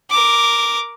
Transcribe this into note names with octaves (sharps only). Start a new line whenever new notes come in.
A#4 D6